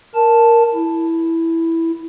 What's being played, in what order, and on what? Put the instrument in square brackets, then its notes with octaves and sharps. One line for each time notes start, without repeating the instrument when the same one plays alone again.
[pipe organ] A#4 A5
E4